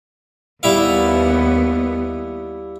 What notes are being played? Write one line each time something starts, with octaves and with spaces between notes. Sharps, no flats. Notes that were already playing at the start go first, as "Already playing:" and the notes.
D#2 G3 B3 E4 F5